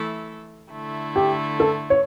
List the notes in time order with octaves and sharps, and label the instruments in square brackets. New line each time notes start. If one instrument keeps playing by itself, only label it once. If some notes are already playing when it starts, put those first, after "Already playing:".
Already playing: [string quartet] E3 A3 E4 A4
D3 A3 E4
[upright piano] G4
A4
C#5